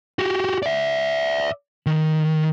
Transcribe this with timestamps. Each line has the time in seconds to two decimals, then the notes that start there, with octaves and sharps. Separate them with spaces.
0.19 F#4 G4
0.62 D5 E5
1.86 D#3